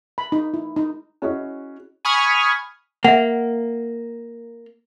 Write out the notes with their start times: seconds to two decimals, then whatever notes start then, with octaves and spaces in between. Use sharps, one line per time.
0.18 B5
0.32 D#4
0.54 E4
0.76 D#4
1.22 C#4 E4 F#4 G#4 C#5 D#5
2.05 G#5 B5 C#6 D#6 F6 G#6
3.04 A#3 E5 F#5